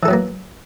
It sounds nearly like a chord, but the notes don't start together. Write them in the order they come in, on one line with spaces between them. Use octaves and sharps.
E3 A4 F#3 B3 A#3